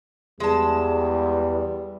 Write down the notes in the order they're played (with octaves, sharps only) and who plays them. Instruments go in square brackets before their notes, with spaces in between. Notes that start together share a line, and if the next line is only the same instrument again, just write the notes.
[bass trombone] E2 [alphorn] G3 [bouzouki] G#3 A5